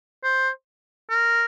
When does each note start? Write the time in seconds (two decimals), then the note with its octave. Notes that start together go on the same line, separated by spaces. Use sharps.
0.23 C5
1.10 A#4